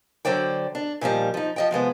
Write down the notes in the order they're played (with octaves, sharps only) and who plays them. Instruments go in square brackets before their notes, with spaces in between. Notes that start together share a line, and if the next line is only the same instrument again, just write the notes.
[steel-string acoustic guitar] D3 F#3 C5 D5 G5
D4
A#2 D#3 F3 G3
F3 D#4
F3 D#5 G5
C3 F3 G#3 B3